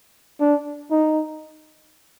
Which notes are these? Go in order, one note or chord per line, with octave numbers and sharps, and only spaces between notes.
D4
D#4